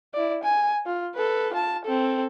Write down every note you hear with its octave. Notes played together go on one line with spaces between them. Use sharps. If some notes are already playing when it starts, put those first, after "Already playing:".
E4 D5
G#5
F4
A4 B4
F4 A5
C4 A4